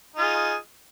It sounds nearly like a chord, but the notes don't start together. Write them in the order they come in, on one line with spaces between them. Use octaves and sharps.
D#4 F4 G#4